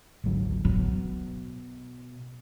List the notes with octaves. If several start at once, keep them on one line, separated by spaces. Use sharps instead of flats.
G#1 D2 F#3
B2 F#3